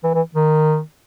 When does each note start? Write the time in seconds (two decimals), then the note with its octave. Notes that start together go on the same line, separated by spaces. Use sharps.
0.03 E3
0.14 E3
0.35 D#3